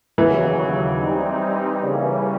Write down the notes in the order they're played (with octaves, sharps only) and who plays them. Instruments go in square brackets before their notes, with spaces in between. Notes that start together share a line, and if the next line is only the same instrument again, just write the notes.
[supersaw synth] D#2 C#3 F#3 [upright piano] E3
[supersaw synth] G3 C4 D#4
C#3 E3 G3 A#3 C#4